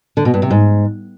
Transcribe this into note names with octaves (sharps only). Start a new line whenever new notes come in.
D3
B2
G2
C3
G#2